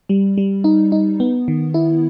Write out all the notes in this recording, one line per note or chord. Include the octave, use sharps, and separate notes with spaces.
G3
G3
D#4
D#4
B3
D#3
E4